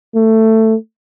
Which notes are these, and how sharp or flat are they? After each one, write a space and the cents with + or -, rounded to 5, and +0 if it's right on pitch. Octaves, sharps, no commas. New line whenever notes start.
A3 +15